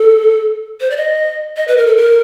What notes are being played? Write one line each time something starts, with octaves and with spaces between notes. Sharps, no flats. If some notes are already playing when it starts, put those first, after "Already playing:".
Already playing: A4
C5
D5
D#5
D#5
B4
A#4
A4
A#4